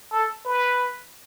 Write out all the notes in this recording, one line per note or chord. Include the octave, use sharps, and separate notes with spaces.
A4
B4